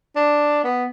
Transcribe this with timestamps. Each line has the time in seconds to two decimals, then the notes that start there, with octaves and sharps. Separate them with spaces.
0.16 D4
0.64 B3